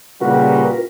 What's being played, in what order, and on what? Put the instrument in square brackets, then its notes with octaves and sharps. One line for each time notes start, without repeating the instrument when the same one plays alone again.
[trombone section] A#2 G3 [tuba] C#3 [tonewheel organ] F4 A#4 B4 [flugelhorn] F#4